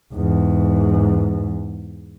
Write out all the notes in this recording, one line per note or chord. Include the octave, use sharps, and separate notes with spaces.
E2 G#2